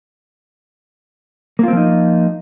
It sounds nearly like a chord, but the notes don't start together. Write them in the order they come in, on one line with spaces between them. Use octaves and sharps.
A#3 F4 C4 F3 D#4